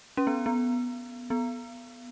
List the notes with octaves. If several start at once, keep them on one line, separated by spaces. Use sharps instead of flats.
C#4
B3
B3
B3